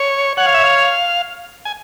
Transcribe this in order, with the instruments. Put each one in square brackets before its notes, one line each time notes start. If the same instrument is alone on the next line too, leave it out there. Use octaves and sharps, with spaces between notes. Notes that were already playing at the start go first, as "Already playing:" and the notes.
Already playing: [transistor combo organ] C#5
[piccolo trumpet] C#5 [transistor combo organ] F#5
[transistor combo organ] F5
E5
F5
G#5